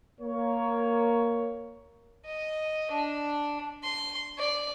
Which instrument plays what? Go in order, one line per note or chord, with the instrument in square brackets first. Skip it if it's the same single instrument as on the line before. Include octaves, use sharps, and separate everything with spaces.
[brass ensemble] A#3 C#5
[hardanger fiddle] D#5
D4
C6
D5